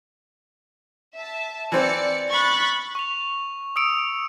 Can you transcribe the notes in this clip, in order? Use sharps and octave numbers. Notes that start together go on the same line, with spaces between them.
E5 A5
E3 C4 D5 C#7
B5 C#6 F#6 A6
C#6 F7
D#6 E6 C#7 D7 F7